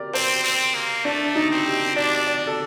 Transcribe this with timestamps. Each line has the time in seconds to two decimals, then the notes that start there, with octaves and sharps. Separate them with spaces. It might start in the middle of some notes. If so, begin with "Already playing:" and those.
Already playing: G4 A#4 D5
0.14 C4 C5
0.44 C4
0.75 A#3
1.05 A3 D4
1.35 D#4
1.51 C4
1.66 G4
1.96 D4 D5
2.27 D5
2.47 A4